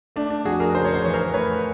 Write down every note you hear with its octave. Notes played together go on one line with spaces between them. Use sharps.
A3 D4
D4
F2 F#4 G#4
G#4 A#4
C#3 C5
C#5
C5
E3 C#5
A#4 C5
A3 B4 C#5